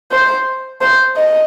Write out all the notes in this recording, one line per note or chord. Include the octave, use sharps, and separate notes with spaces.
C5
C5
D#5